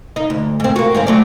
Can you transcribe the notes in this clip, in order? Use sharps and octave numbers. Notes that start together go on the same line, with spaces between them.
D#4
D2
G#2 C4
A#3 F#4
G#2 D#3 C4
F#3 A3 D5